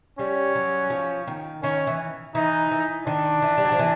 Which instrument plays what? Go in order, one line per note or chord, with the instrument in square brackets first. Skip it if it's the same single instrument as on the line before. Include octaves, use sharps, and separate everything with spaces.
[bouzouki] G3 [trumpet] C#4
[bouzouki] F#3
F3
D#3
[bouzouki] D#3 [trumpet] C#4
[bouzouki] E3
[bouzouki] E3 [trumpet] D#4
[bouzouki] E3
[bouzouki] D#3 [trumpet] D4
[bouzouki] E3
G3
F#3
F3
E3